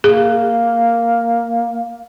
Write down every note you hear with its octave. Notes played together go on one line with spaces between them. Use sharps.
A#3 G#4